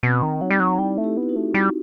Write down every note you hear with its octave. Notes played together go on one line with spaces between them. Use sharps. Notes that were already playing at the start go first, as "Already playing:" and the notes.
B2 C4
D#3
F#3 D#4
G3
F#3
D#4
G3 E4
A3
E4 G4
B3
E4
D#4 F#4
A3
G3